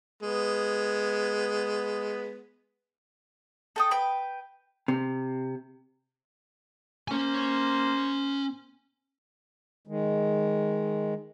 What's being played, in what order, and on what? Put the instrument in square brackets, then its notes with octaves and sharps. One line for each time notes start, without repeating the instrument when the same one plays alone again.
[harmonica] G#3 B3
[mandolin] A4 G5 D#6
B4 G5
[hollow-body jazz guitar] C3
[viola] A#3 C5 [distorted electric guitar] C#4 G#5
[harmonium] D#3 G#3